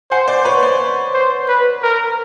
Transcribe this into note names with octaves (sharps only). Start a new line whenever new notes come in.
C5 F#5 G#5
C5 D5
B4 C#5
C5 D5
C5
B4
A#4